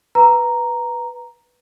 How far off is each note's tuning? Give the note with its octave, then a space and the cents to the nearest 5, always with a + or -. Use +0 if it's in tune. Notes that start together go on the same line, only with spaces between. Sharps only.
B4 -5 A#5 +0